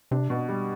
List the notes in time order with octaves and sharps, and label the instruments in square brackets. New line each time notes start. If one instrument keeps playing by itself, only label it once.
[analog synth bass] C3 [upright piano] D4
[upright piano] B2
G3